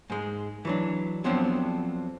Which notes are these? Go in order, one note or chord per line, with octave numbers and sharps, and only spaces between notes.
G#2 G#3
E3 F#3 D4
F2 F3 F#3 B3 C4 D4